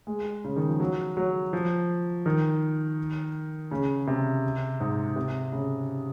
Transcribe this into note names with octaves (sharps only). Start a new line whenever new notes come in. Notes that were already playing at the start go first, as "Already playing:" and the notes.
G#3
C#3
D#3
F3
F#3
F#3
F3
D#3
C#3
C3
G#2
C3
C#3